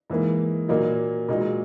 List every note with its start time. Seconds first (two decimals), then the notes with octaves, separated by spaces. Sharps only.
0.10 G#2 E3 A#3
0.69 A#2 F#3 A#3 D#4
1.29 A#2 G#3 D#4 F#4